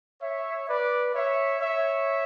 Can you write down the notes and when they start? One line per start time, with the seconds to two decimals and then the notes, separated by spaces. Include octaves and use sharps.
0.22 C#5 E5
0.68 B4 D5
1.14 C#5 E5
1.60 C#5 E5